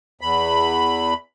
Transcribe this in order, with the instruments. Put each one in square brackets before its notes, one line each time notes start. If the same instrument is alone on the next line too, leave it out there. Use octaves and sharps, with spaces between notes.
[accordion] E2 B5